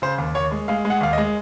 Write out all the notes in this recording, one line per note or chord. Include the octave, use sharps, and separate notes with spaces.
C#3 C5
D#2
D#2 C#5
G#3
G#3 F5
G#3
F#5
D#2 F5
D#5
G#3